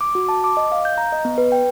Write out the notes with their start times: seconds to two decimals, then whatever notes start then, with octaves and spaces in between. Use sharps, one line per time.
0.01 D6
0.15 F#4
0.29 A5
0.44 D6
0.57 D#5
0.72 F5
0.85 G6
0.98 A#5
1.12 D#5
1.25 B3
1.38 B4
1.52 G5